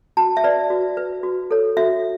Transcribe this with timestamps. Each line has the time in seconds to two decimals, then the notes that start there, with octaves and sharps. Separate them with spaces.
0.17 F#4 A5
0.37 E5
0.44 B4 D5
0.70 F#4
0.97 B4
1.23 F#4
1.51 A4 C#5
1.77 F#4 E5